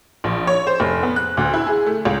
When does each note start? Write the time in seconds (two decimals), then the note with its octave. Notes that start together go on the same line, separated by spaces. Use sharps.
0.24 A#1
0.47 C#5
0.67 C5
0.80 F1
1.03 B3
1.16 F#6
1.37 D2
1.54 E4
1.67 G#4
1.86 A3
2.05 C#2